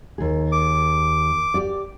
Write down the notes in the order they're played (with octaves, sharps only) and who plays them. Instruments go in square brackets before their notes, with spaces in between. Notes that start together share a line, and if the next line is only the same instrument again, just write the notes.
[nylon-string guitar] D#2 G#4
[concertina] D6
[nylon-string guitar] G4 D5